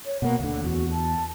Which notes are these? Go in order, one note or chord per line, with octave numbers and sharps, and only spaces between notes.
C#5
B2 A#3 F#5
D2 D3 F#5
E2 F#4
A5